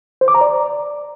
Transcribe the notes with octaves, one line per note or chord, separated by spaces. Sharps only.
C5
D6
A#5
D5